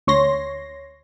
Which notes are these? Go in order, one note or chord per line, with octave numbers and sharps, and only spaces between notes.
D2 C#5 C6 A#6